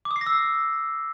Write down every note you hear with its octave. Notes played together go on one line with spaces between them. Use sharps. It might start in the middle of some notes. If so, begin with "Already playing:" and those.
D6
D#6
C7
A#6
E6